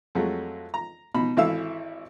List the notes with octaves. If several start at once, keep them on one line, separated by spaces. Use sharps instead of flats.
F2 F#3 G#3 A3
A#5
B2 D#4 B5
G#1 E3 A4 E5 F5 E6